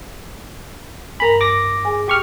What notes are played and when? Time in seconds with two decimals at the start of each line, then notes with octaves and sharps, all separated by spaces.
1.20 G2 A#4 G#5 A#5 B5
1.41 D6 A#6
1.85 G#4 G#5
2.08 G4 C#6 F6